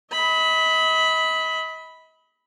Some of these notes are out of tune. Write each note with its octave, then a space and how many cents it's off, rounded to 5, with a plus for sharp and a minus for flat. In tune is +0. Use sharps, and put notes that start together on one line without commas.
D#5 +40 B5 +0